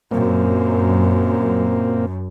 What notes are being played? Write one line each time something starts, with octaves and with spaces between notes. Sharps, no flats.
F#2 A#2 A#3 C4